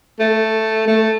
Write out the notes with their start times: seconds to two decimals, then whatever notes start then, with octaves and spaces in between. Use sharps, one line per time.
0.19 A3
0.88 A3